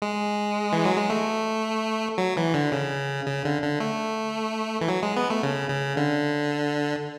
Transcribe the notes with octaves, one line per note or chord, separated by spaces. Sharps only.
G#3
E3
F#3
G#3
A3
F#3
E3
D3
C#3
C#3
D3
D3
A3
E3
F#3
G#3
B3
A3
C#3
C#3
D3